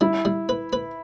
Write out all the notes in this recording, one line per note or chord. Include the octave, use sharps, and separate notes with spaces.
G3 E4
G3
B4
B4